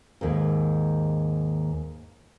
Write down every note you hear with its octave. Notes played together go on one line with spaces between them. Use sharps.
D#2 G#2